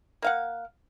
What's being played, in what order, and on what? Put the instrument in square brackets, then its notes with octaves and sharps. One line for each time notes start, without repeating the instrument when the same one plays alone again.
[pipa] A#3 F5 F#5